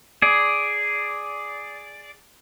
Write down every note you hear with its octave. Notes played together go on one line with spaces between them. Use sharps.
G#4 D5